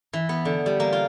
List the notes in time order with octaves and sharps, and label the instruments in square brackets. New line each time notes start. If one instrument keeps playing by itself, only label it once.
[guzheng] E3
B3
D3
G3
A#3
F4